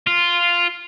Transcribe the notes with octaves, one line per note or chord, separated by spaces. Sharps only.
F4